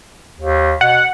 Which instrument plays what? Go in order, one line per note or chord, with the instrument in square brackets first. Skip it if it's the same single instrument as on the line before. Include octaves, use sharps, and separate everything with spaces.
[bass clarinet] D#2
[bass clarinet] B2 [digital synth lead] F#5